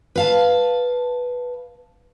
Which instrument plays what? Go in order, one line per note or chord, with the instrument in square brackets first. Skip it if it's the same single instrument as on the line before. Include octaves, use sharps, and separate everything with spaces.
[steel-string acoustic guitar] B4 F5 A5